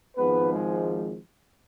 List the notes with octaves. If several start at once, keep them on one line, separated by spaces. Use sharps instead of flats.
G#1 G#2 F3 G#3 B3 B4
G#3 G#4